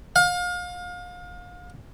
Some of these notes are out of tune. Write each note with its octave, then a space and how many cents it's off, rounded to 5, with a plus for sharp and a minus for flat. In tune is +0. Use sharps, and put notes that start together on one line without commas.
F5 +35